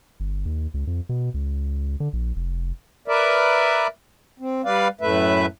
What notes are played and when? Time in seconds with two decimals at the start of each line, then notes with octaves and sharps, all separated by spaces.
0.20 G1
0.45 D#2
0.74 C#2
0.87 F2
1.09 B2
1.34 C#2
2.00 D3
2.13 A#1
2.36 F1
3.08 A#4 B4 D5 E5
4.40 C4
4.65 G3 B4 D5 F5
5.01 F#2 A2 A3 B4 E5